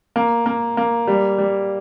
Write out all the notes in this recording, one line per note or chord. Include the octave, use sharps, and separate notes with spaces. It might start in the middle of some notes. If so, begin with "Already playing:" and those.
A#3
A#3
A#3
G3
G3